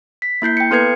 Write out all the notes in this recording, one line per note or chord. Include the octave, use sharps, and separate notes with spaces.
B6
A#3 E4 G6 C7
G5 C#7
B3 A4 B4 G#6 C7 C#7